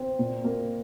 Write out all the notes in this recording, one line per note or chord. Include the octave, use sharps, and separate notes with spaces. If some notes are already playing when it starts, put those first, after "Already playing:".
Already playing: C4
A#2
A#3